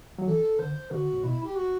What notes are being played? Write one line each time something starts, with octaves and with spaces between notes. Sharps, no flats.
F#3
E3 A4
D3 C5
D3 F#4
A2
B2 E4
G4
F#4